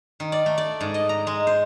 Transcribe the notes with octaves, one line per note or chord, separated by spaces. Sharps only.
D#3
D5
A3
D5
G#2
D#5
A#5
G#3
C5